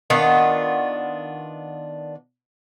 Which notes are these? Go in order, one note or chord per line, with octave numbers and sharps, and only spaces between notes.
D#3 B3 D4 F4